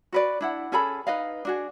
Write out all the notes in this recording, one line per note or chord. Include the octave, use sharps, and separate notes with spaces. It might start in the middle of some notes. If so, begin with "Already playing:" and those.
F#4 B4 D5
D4 E4 F#5
C#4 G#4 A4 B5
D#4 B4 D#5 F5
D4 F#4 G#4